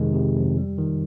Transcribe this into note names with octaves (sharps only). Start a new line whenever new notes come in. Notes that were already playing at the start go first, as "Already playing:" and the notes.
Already playing: F2 C3 D#3 G#3
C3
F2
G3
D#3